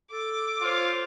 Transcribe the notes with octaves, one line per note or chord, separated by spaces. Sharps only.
A4 D6
F4 C5 C#5